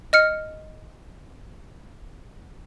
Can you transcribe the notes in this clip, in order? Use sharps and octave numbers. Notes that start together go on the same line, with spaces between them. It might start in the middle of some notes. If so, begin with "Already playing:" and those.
D#5 F6 C#7